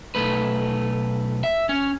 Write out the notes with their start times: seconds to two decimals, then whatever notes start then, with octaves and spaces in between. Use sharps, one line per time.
0.15 B1 A3 B4
1.44 E5
1.69 C#4